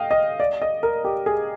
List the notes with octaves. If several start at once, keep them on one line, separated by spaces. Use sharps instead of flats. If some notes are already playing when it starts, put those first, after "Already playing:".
Already playing: D#5 F5 G5
D#5
D5
D#5
A#4
G4
G#4